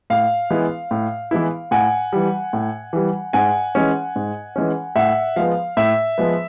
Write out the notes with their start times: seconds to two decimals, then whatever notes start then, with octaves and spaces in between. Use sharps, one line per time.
0.10 A2 F5
0.50 E3 G#3 B3 E4
0.91 A2
1.31 E3 G#3 B3 E4
1.71 A2 F#5 G#5
2.13 E3 G3
2.53 A2
2.93 E3 G3
3.33 G#2 F#5 G#5
3.75 E3 G#3 C#4
4.16 G#2
4.56 E3 G#3 C#4
4.96 A2 E5 F#5
5.36 F3 G#3 B3 F5
5.77 A2 E5
6.18 F3 G#3 B3